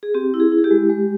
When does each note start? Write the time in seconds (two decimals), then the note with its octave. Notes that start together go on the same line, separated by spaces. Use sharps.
0.03 G#4
0.14 C4 G4
0.34 E4
0.40 G#4
0.52 E4
0.58 G#4
0.64 G4
0.71 G#3
0.89 G#3